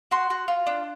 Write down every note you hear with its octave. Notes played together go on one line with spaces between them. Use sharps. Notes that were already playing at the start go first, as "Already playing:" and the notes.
F#4 C6
F#4
F4
D4